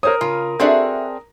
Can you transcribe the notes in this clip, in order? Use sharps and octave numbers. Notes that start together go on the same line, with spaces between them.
A#4 C5 C#5 D#6
C#3 F4
C4 D4 F#4 G#4 A4 E5